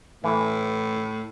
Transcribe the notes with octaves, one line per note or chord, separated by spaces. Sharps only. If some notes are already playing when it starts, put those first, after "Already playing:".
A2 E3